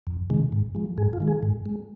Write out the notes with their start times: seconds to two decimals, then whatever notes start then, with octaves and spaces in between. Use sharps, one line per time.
0.07 F2
0.30 C3 D#3 G#3
0.52 G#2
0.75 F3 G#3
0.98 G#2 G#4
1.13 F4
1.20 D#3 G#3
1.28 G#4
1.43 G#2
1.66 G#3